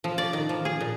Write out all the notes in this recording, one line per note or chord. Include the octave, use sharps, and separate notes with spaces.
F3
D5
D#3
F3
G#4
A#2